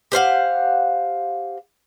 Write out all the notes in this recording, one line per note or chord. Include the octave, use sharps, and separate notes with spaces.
G4 C5 F5 F#5